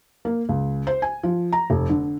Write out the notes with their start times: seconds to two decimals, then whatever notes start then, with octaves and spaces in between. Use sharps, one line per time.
0.25 A#3
0.49 C#2
0.87 C5
1.02 G#5
1.23 F3
1.52 A#5
1.70 F1
1.90 D3